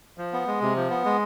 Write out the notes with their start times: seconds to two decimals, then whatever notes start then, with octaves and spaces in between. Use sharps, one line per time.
0.18 F3
0.33 B3
0.47 G#3
0.61 C3
0.76 F3
0.90 B3
1.05 G#3